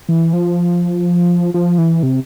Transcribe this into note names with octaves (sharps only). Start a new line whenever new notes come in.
E3
F3
F3
E3
C3